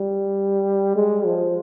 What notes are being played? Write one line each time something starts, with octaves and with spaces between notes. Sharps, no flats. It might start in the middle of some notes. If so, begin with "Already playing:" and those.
Already playing: G3
G#3
F3